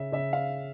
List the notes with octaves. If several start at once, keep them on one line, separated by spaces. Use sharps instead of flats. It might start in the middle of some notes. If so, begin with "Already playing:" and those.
Already playing: C#3 E5
C#3 E5
F5